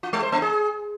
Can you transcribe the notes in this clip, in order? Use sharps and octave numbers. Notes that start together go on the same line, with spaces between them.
F4
G#3
C5
A#3
G#4